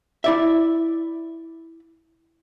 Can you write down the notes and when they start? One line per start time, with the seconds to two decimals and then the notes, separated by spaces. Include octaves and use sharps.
0.24 E4 D5 E5